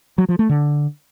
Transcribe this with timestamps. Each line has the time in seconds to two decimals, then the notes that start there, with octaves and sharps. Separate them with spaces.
0.18 F#3
0.29 F3
0.39 A3
0.49 D3